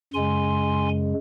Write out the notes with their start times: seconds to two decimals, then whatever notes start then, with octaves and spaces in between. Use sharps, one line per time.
0.13 F#2 C#3 G#3 G#5 C6